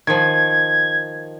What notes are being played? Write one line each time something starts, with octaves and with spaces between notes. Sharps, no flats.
D#3 F3 G#6